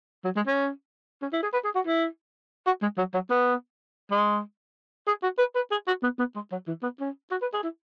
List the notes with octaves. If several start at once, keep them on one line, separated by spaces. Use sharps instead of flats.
F#3
G#3
C#4
C#4
E4
G#4
B4
G#4
F#4
E4
F#4
G#3
F#3
F#3
B3
G#3
G#4
F#4
B4
B4
G#4
F#4
B3
B3
G#3
F#3
E3
B3
C#4
F#4
B4
G#4
E4